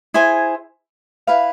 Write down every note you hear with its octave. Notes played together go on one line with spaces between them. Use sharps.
E4 G#4 C5 G#5
E4 B4 F5